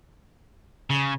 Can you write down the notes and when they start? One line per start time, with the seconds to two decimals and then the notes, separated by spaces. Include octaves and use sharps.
0.90 C#3